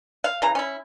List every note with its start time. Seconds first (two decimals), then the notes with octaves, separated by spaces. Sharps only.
0.24 F5
0.42 C#3 E3 E4 A#5
0.55 C#4 E4